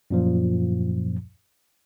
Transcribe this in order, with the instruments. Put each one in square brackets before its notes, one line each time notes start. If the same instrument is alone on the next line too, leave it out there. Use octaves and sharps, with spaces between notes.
[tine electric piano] F#2 A#2 F3